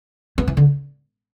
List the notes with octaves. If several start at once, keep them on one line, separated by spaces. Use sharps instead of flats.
B3
E3
D3